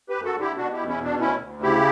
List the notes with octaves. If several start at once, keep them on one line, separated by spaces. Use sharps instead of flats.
G4 B4
F#2
F#4 A4
D3
E4 G4
B2 D4 F#4
E4 G4
E2
C#4 E4
B2
D4
D2 C#4 E4
D2
C#3 E4 G4